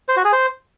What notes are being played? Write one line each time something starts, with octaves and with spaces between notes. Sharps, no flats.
C5
F#4
G#4
C5